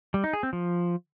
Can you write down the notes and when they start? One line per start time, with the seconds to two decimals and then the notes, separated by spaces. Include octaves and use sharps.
0.14 G3
0.24 D#4
0.33 G#4
0.43 C4
0.53 F3